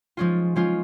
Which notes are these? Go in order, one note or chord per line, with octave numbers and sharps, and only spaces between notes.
F3 G#3 C#4 F4
F3 G#3 C#4 F4